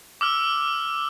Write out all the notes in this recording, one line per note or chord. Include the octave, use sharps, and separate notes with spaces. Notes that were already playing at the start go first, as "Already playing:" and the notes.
D6 E6 F6